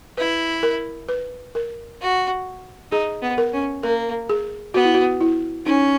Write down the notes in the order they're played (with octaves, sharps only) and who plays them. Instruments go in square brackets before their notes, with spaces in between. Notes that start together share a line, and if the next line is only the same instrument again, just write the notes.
[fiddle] E4 [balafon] B4
[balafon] A#4
B4
A#4
[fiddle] F#4
[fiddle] D#4 [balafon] G#4
[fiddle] B3
[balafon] A#4
[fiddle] C#4
[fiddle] A#3 [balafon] A#4
[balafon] G#4
[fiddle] B3 [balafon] F#4
[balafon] E4
F#4
E4
[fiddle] C#4 [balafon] D#4